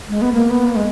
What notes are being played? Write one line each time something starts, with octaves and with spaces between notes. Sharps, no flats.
G#3
B3
A#3
B3
A#3
G#3